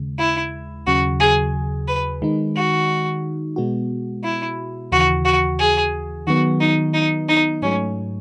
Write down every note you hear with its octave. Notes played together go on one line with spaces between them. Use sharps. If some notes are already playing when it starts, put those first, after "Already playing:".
Already playing: D#2 C#3 G#3
E4
D#2 C#3 F#3 F#4
G#4
B4
D#3 G#3 D#4
F#4
B2 G#3 B3 F#4
E4
D#2 C#3 E3 F#4
F#4
G#4
D#3 F#3 B3 F#4
D#4
D#4
D#4
G#2 F#3 A3 C#4